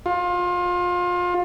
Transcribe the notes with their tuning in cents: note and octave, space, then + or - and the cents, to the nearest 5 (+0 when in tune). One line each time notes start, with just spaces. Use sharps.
F4 +25